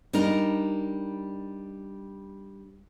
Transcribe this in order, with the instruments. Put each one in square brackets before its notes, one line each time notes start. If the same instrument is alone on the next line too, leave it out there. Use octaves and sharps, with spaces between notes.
[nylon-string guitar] G3 D4 D#4 A#4